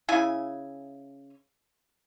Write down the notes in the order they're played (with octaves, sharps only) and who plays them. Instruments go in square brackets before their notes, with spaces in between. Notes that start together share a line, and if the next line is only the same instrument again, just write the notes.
[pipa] C#3 E4 G#5